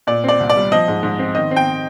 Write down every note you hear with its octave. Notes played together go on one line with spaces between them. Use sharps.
A#2 D5
C4 D5
C2
D5
G3
F3 D#5
G#2
G#2
C4
D#3 D#5
C4
G5